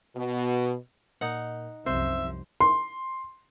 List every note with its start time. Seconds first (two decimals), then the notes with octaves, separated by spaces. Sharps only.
0.16 B2
1.21 A#2 D#4 F#5
1.86 C2 F#2 F3 C4 C5 E5
2.60 C6